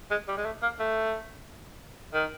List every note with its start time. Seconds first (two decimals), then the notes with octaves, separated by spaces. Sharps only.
0.11 G#3
0.28 G3
0.37 G#3
0.45 A3
0.62 A#3
0.79 A3
2.13 D#3